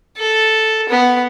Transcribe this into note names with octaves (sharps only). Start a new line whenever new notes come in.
A4
B3